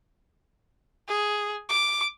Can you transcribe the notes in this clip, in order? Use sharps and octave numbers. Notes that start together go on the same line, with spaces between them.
G#4
D6